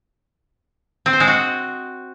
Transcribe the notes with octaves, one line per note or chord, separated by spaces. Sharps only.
C4
C5
G#3
F#4